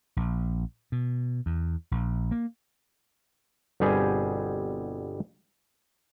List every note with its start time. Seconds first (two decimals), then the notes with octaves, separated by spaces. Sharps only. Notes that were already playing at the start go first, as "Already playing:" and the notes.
0.17 A#1
0.92 B2
1.46 E2
1.91 A#1
2.31 A#3
3.80 G1 B2 G3 C4 G#4 G#5